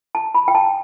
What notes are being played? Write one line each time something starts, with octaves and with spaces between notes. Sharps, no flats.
A5
B5
G5
A5